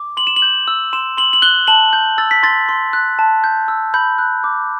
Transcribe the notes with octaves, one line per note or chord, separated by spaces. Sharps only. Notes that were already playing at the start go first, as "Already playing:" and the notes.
Already playing: D6
C6 F#7
E7
F#7
G6
E6
C6 E7
C6 F#7
F#7
F#6 G7
A5 F#7
G6
E6 A6
B6
C6 A6
C6
F#6
A5
G6
E6
B5 G6
F#6
D6